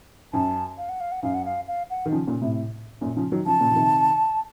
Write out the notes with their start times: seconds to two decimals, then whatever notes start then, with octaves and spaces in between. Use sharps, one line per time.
0.33 F#2 A5
0.78 F5
0.89 F#5
1.00 F5
1.12 F#5
1.23 F#2 F5
1.34 F#5
1.45 F5
1.67 F5
1.90 F#5
2.06 D#3
2.12 C#3 F3
2.27 A#2 C#3
2.42 A2 C3
3.01 F#2 A#2
3.16 C#3 F3
3.32 D#3 F#3
3.46 C#3 F3 A5
3.61 A#2 C#3
3.71 F3
3.76 C3 D#3